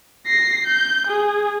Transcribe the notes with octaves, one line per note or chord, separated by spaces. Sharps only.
A#6 C7
G6
G#4